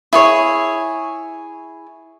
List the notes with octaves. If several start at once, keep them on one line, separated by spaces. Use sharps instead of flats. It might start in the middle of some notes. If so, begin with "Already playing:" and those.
E4 G#4 C#5